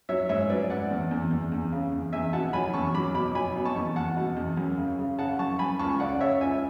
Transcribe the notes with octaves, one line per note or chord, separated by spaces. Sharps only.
F#3 C#5 E5
G#2 C#5 E5
F#3 B4 D5
G#2 D5 F#5
E2
E2
E2
E2
C#3
E2
E2 E5 G#5
B2 F#5 A5
F#3 G#5 B5
E2 A5 C#6
F#3 B5 D6
B2 B5 D6
F#3 G#5 B5
B2
A5 C#6
E2
E2 F#5 A5
B2
E2
F#2
C#3
C#3
C#3 F#5 A5
F#2 A5 C#6
F#2 G#5 B5
C#2 A5 C#6
C#3 D5 F#5
C#3 C#5 E5
C#2 E5 G#5